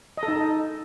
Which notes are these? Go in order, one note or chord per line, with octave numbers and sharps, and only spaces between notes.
D#5
A4
D#4